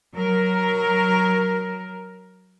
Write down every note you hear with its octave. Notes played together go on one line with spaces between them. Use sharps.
F#3 A#4